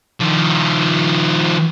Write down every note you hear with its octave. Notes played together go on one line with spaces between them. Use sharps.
D#3 F3